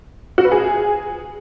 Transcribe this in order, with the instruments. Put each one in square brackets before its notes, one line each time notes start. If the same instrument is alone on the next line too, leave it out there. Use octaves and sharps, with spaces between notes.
[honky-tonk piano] F#4
B4
G#4